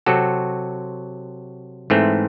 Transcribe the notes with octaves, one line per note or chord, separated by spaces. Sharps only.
C3 F#3 C4 F#4 A4
G#2 E3 A3 C4